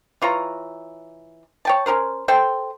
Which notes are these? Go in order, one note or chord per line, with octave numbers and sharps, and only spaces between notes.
E3 F4 C#5 A#5
C#5 G5 A5
C#4 G#4 A#4 C5
A4 C5 G5